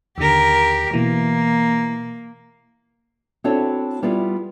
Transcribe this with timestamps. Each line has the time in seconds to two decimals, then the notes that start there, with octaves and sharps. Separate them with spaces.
0.18 D#2 D3 G4 A#4
0.94 B2 E3 A#3
3.44 C4 D4 E4 F#4 A4 C#5
4.02 G3 B3 E4 F4 G#4